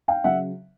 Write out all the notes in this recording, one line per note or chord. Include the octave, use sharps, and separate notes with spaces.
F5 G5
C#3 F#3 E5 F#5